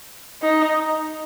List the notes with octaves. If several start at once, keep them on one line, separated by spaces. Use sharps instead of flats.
D#4